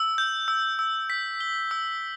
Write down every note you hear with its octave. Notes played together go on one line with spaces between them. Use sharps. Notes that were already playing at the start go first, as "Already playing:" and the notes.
Already playing: E6
G6
E6
E6
B6
G7
E6